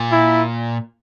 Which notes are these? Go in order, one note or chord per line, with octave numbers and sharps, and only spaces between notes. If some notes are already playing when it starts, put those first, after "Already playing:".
Already playing: A#2
E4